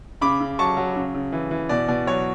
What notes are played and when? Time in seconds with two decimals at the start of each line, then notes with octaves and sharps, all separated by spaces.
0.21 C#3 B5 D6
0.40 C#3
0.59 F#3 A5 C#6
0.77 F#3
0.96 C#3
1.14 C#3
1.32 E3
1.51 E3
1.69 B2 D5
1.88 B2 D5
2.07 F#3 C#5